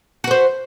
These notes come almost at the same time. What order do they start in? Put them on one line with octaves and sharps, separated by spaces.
F#4 B4 C5